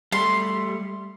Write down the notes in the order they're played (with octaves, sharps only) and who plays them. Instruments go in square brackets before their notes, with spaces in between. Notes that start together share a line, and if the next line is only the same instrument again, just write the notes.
[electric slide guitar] G3 A3 [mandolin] C6